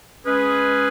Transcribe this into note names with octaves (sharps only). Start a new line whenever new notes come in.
G#3 C#4 G#4 B4